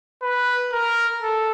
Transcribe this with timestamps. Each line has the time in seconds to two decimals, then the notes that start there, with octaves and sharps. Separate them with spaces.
0.22 B4
0.72 A#4
1.22 A4